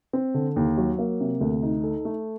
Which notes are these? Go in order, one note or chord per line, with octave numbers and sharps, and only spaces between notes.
C4
D3
D#2
F#3
A#3
C3
D2
D#4
A4
A3